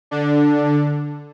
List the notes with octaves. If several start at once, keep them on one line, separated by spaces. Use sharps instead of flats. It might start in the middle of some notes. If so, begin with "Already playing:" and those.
D3 D4